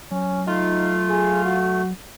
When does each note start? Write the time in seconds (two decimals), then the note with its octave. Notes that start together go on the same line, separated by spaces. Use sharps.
0.11 F#3 C#4
0.47 A3 D#4 F4
1.10 G#4
1.45 F#4